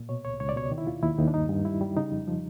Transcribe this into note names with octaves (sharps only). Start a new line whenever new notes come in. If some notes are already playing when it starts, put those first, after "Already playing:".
Already playing: A#2
B2 C#5
C#2 C#5
C#2 C#5
D5
B2 C#5
D#3
E4
D#2 F4
D#2 E4
D#2 D#4
D4
G2 D#4
G2
G3 E4
G3
C#3 D#4
F2
F3